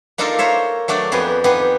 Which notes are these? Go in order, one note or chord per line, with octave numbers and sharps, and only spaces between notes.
A#3 D4 D#4 F4 A4 A#4
A#4 C5 C#5 E5
F#3 A3 D4 D5
F2 B3 G4 G#4
B3 D#4 G4 G#4